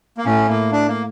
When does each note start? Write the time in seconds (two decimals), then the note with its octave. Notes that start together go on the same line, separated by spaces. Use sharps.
0.18 A#3
0.25 A2 C#4
0.49 A#3
0.73 D4
0.88 A#3